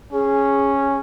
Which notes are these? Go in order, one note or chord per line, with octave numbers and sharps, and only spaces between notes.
C#4 G#4